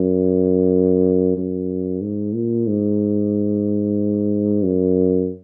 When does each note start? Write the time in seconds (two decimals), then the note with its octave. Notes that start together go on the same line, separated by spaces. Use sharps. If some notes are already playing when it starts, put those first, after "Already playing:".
Already playing: F#2
1.37 F#2
2.01 G#2
2.35 A#2
2.67 G#2
4.63 F#2